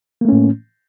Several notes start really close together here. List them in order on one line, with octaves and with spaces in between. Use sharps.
A#3 A3 C#4 A2